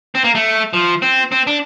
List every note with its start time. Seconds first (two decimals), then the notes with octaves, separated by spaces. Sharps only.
0.15 C4
0.24 A#3
0.35 A3
0.73 F3
1.02 C4
1.32 C4
1.47 D4